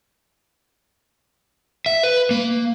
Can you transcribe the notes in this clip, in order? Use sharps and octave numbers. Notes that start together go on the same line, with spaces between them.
E5
B4
A#3